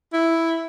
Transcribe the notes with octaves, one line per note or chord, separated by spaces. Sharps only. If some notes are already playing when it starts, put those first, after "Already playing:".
E4